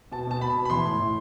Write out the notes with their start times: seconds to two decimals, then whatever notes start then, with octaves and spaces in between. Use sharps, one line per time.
0.12 B2 A5
0.27 B2 A5
0.40 B2 B5
0.56 B2
0.65 B5
0.70 E3 C6
0.85 A2
0.99 A2